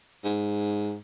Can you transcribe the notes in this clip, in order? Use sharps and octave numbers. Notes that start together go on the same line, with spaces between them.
G#2